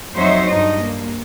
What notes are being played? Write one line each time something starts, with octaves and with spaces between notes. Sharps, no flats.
F2 F#3 D#4 C5 C#5 E5
G2 D#4 D#5
A#3